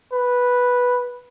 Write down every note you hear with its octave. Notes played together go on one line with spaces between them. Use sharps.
B4